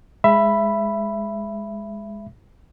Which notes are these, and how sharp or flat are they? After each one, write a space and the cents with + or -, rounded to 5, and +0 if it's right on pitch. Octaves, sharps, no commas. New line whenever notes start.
G#3 -5 E5 +20 B5 +0